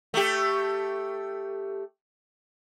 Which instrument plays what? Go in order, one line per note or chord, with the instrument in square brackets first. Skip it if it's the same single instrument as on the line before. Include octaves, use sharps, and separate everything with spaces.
[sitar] A3 G4